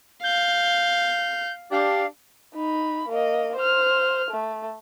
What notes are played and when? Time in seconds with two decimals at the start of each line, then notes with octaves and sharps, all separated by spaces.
0.23 F5 G6
1.72 D4 G4 F5
2.54 D#4 B5
3.08 A#3 D#5
3.55 C5 F6
4.31 A3